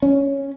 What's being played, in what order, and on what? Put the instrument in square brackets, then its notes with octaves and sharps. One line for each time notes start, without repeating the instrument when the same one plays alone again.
[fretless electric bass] C#4